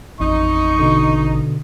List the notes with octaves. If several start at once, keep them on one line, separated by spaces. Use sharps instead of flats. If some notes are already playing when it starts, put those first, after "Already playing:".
A1 F2 D#4 C#6
B2 D3